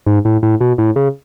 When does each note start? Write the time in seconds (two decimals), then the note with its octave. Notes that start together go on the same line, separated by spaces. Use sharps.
0.06 G#2
0.25 A2
0.43 A2
0.61 B2
0.78 A2
0.96 C#3